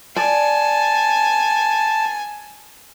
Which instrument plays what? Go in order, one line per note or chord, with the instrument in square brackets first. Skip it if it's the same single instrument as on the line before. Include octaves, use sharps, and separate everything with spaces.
[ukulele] D5 [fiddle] G#5 [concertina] A5